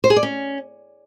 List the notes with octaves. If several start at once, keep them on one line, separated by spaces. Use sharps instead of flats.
C5
G#4
D5
C#4